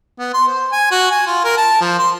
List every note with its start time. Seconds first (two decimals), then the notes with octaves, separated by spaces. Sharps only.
0.19 B3
0.34 C6
0.47 C5
0.72 G#5
0.91 F#4
1.11 G#5
1.27 F4
1.44 A#4
1.57 A5
1.81 F3
1.99 C6